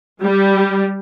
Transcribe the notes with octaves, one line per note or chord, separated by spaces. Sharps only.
G3